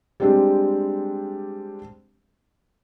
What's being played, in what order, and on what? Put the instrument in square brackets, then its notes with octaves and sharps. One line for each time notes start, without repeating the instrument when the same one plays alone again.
[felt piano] G3 G#3 C4 D4 G4